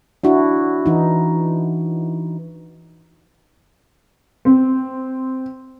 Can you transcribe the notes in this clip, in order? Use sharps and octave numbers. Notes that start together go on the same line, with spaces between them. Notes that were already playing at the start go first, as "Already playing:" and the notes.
D4 E4 F#4
E3 D#4
C4